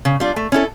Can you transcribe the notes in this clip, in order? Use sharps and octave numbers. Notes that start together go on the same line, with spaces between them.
C#3
G3 D4 F4
A3
C#4 E4 A4